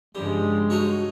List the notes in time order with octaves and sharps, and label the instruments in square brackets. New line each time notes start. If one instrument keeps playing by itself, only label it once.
[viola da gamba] G2 C#3 F3 [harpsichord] G3 [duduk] G#3
[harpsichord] D#4 A4 C#5 [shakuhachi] F#4